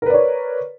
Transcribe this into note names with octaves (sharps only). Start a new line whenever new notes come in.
A#4 B4 C#5 D5